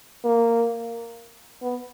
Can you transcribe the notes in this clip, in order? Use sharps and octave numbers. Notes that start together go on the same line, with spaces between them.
A#3
B3